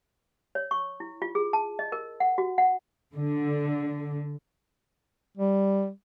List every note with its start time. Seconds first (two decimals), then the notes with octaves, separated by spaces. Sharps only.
0.55 C#5
0.71 C#6
1.00 E4
1.22 F4
1.35 G#4
1.53 A5
1.79 D#5
1.92 A#4
2.20 F#5
2.38 F#4
2.58 F#5
3.16 D3
5.37 G3